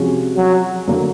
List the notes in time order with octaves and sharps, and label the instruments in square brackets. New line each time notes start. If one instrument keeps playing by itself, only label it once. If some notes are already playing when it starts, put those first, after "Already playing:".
Already playing: [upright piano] C3 F3 G#3 C#4 F#4
[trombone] F#3
[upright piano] D3 F#3 A#3